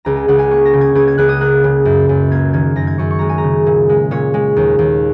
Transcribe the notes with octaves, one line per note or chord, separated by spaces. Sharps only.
C#2 A#5
G#5
C#2 F#5
G#5
A#3 C#6
A#6
C#3
G#6
C#2 G#6
G#6
C#2 F#6
D#6
A#3 F#6
C#3
F#2
F#2
A#3 G#6
D#3 G#6
F#2 A#6
G#6
F#2 C#6
C#6
G#3 A#5
G#5
A#5
C#3
A#2
G#3
A#2 C#5
G#3
D#2
D#2